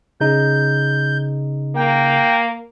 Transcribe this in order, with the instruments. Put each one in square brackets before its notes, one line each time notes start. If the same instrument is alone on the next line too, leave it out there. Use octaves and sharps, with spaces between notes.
[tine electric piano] C#3 D#4 [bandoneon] G6
[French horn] A#3 [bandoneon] G5